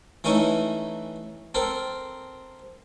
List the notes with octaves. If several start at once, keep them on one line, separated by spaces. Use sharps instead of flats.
E3 A3 C#4 D#4 E4
C4 A4 A#4